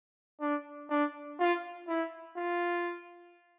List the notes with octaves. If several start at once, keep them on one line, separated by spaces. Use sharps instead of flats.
D4
D4
F4
E4
F4